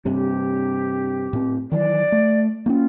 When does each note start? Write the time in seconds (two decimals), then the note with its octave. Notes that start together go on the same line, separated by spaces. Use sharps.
0.05 G2 C3 G4
1.33 A2 C4
1.72 D#3 E3 F#3 D5
2.12 A3
2.66 A#3 C4 C#4 F4